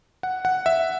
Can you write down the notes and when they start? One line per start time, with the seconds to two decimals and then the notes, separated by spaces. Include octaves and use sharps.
0.23 F#5
0.45 F#5
0.66 E5